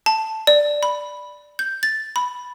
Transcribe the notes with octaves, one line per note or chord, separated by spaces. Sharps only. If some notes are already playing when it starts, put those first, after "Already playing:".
A5
D5
B5
G6
A6
B5